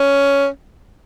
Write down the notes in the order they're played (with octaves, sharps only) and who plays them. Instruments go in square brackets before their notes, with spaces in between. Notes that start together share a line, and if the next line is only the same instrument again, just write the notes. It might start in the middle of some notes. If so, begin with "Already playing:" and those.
Already playing: [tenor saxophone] C#4